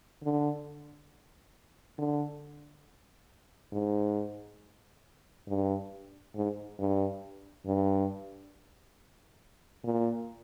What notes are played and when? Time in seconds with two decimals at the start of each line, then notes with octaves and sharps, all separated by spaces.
0.23 D3
1.98 D3
3.72 G#2
5.48 G2
6.35 G#2
6.79 G2
7.66 G2
9.84 A#2